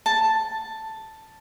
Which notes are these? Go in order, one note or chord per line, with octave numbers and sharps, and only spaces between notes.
A5